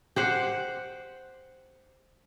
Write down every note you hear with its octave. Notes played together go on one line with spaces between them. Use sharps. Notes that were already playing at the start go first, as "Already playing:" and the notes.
G4 C5 F#5